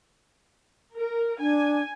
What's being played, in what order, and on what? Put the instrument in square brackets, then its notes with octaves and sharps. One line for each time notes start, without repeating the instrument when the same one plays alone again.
[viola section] A#4
[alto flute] D4 [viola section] G#5